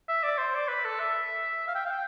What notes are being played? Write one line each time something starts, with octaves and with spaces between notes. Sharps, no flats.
E5
D5
C5
D5
B4
A4
E5
F5
G5
F5
G5